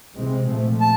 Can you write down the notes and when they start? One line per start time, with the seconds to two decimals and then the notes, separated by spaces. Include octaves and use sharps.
0.16 C3 E3 G#3 C4
0.48 A#2 F3 A3
0.81 A5